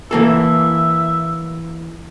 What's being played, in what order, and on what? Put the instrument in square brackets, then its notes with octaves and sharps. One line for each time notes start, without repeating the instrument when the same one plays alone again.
[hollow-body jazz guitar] E3 A#3 A4 [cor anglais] E5